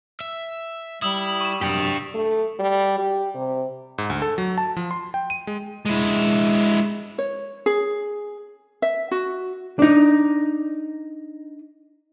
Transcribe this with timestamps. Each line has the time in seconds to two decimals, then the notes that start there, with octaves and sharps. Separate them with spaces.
0.21 E5
1.02 G3 E4 D#6 E6 F#7
1.41 C#6 E7
1.61 C2 F#2 D4 G4
2.14 A3
2.59 G3
2.99 G4
3.35 C3
3.98 G#2
4.10 D2
4.22 A4
4.38 F#3
4.58 A5
4.77 F3
4.91 C6
5.14 G5
5.30 D#7
5.47 G#3
5.86 G#3 E4
7.18 C#5
7.66 G#4
8.82 E5
9.11 F#4
9.79 D4 D#4